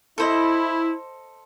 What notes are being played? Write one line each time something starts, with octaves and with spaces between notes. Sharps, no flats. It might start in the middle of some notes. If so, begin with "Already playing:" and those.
E4 A4 C5 D#5